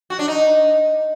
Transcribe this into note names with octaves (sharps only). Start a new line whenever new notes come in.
F#4
D4
D#4